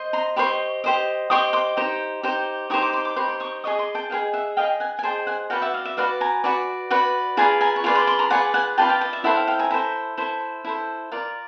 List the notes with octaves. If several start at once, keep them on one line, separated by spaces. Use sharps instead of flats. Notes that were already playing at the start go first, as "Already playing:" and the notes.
Already playing: C5 D#5
A#5 C6
G4 C5 D#5 B5 C#6
G4 C5 D#5
G4 C5 D#5 C#6 D#6
C6 D6
D#4 G4 C5
D#4 G4 C5
D#4 G4 C5 C#6 D#6
C6 D6
C6 D6
C6 D6
D#4 G4 C5 B5 C#6
C6 D6
C#6 D#6
G#4 C5 D#5 C#6 D#6
C6 D6
G5 A5
G#4 C5 D#5 F5 G5
E5 F#5
G#4 C5 D#5 F5 G5
F#5 G#5
G#5
G#4 C5 D#5 G5 A5
F#5 G#5
F#4 B4 D5 F5 G5
E5 F#5
D#5 F5
E5
F#4 B4 D5 D#5 F5
G#5 A#5
F#4 B4 D5
F#4 B4 D5
F4 G#4 B4 D5 G#5 A#5
G#5 A#5
C#6
F4 G#4 B4 D5 C6
C6 D6
C6 D6
A#5 C6
F4 G#4 B4 D5 F#5 G#5
F#5 G#5
F4 G#4 B4 D5 G5 A5
F5 G5
D#5
E5
E4 A4 C5 E5 F#5
F5 G5
F5 G5
G#5 A#5
E4 A4 C5
E4 A4 C5
E4 A4 C5
F4 A#4 D5